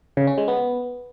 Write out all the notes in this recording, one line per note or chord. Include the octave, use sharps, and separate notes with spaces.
C#3
C#4
G#3
B3